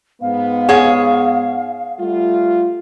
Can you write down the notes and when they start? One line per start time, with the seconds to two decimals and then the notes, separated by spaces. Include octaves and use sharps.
0.22 G#2 B3 F5
0.69 G#4 C#5 F#5
1.99 G3 A3 F4